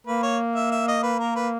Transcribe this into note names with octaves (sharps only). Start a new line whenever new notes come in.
A#3 B4
C#5
E5
E5
D#5
B4
A#4
B4